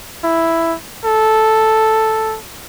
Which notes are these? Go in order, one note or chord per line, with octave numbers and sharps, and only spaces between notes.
E4
A4